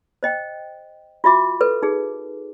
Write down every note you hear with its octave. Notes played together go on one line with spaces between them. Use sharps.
C5 D#5 G5
F4 F#4 E5 D6
A4 B4
D#4 G#4